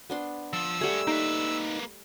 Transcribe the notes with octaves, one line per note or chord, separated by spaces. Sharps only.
B3 D4 C6
F3 E6
G3 A3 G#4 F#5
A#3 D#4 B4